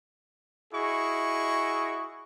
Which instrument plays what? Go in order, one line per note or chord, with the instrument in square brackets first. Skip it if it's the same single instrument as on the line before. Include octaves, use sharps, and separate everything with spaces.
[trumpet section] E4 F#4 G#4 D#5 C#6